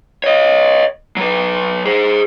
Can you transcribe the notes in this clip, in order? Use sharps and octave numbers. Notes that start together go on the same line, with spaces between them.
C#5 D#5
F#3 B4
G#4 C5